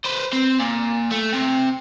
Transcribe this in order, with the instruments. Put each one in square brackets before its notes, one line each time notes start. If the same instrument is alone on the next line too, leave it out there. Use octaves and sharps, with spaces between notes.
[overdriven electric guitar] B4 C5
C4
A#2
A3
C3